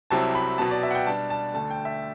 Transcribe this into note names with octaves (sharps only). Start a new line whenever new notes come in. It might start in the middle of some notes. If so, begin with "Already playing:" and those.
C2 C3 F#3 C4 E4 A5
B5
B2 F#3 B3 A5
D5
E5
F#5
G5
B2 G3 D4 A5
A5
D2 D3 A3 A5
G5
E5